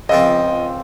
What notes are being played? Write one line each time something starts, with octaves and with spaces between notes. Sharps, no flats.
C#2 F3 C4 D#5